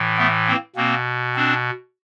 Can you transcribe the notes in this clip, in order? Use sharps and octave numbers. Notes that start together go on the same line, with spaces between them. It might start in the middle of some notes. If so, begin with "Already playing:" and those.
Already playing: A2 E3
A3 B3
A#3 C4
B2 A#3 C4
C4 D4